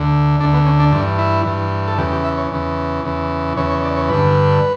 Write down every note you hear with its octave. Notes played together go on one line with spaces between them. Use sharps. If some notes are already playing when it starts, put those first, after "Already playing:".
Already playing: D2 D3
D2 D3 D4
B3
C#4
D4
G2 E3 D4
E4
G2 E3
A4
E2 C#3 E3 G4
G4
E5
C#5
E2 C#3 E3
E2 C#3 E3
E2 C#3 E3 C#5
C#5
D5
C#5
G2 D3 B4